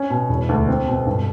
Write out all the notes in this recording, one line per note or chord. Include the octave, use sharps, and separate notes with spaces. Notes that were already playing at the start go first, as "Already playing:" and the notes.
Already playing: C#4
B2
E1
D2
C4
B2
G2